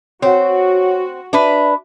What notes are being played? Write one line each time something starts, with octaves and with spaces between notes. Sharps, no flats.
C4 F#4 C#5 F#5
D4 B4 E5